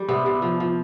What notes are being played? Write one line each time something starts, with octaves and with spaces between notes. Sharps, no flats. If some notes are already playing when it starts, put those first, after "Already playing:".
Already playing: G3
C3 B3
C3
F3
F3